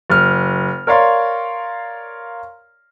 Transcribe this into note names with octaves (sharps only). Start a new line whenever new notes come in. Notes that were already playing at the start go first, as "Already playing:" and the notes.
F#1 F6
A#4 C#5 D5 F5 C6